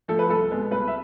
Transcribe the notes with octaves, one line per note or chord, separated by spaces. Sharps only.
F3 A3 A4
B4
C2 A4
B2 G#3 B3
C2 B4
E5